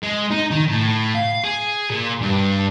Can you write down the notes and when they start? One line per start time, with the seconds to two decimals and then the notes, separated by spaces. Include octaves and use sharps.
0.03 G#3
0.31 D#4
0.51 D#3
0.68 A2
1.15 F5
1.44 G#4
1.90 A#2
2.22 G2